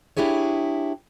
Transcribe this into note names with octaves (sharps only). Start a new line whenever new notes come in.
D4 E4 G4 G#4 C#5